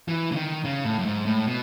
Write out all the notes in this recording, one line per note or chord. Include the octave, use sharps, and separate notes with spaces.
E3
C#3
D#3
C#3
A2
F#2
G#2
A2
B2